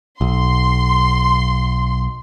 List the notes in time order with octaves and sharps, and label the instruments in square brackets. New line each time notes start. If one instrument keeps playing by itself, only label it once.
[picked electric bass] B1 [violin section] C6